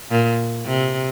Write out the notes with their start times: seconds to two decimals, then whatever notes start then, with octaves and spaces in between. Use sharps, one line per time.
0.11 A#2
0.66 C3